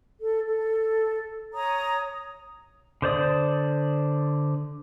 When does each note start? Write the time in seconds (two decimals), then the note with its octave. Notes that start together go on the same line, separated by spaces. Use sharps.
0.19 A4
0.46 A4
1.53 C#5 A#5 D#6
3.02 D3 C5 D5 D#6